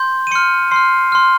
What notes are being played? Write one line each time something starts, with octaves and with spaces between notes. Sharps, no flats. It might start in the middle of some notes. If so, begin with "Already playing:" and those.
Already playing: C6 G6
D#7
C6 F6 C#7
C6 F6 C7
C6 F6